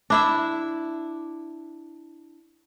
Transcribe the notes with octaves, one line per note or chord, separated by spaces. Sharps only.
D4 E4 E5